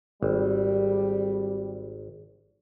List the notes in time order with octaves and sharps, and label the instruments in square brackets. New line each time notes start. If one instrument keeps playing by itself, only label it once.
[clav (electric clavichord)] G#1 [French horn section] G3